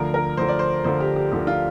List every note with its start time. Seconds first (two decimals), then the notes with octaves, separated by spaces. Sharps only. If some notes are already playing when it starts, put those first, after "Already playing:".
Already playing: D2 D3 F3 A#4
0.14 A#4
0.37 D2 D3 F3 C5
0.48 D5
0.59 C5
0.84 D2 D3 F3 C5
1.00 G4
1.16 G4
1.32 D2 D3 F3 G4
1.47 F4